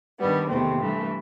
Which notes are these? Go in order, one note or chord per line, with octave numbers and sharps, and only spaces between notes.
G2 D#3 G3 B3
E2 C3 D#3 A3 C4
G2 E3 A3